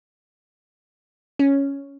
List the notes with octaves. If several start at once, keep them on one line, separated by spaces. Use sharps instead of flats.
C#4